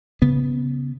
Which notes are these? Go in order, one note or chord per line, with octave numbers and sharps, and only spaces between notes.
C#3 B3